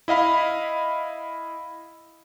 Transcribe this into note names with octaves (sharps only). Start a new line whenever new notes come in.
E4 D#5 F5 B5